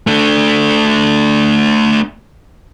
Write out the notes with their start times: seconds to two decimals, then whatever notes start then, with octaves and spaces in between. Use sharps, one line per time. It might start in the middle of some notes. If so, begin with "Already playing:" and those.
0.07 A3 D4